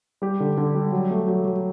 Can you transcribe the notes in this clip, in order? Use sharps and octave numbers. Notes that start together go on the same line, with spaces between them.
G3 G4
D3
D3
G3
F#3
A3
F#3
F#3